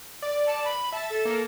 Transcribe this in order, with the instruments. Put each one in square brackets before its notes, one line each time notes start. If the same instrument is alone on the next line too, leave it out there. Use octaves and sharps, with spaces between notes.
[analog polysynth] D5
[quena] A5
B5
[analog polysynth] E5 A6 [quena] A5
[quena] A4
[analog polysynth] A#3 A#4